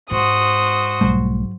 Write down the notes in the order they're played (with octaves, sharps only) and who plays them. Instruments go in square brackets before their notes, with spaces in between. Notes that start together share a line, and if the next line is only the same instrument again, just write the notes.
[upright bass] G#2 [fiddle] F#4 C5 [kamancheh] D#6
[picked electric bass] B1 G3 A3 [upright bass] G#2 F#3